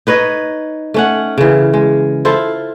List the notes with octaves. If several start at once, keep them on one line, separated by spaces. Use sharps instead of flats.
D#4 B4 C#5 D#5
A3 C#4 F#5
C#3 E3
G#3
E4 F4 A4 C5